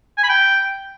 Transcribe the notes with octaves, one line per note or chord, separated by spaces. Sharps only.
G#5
B5
G5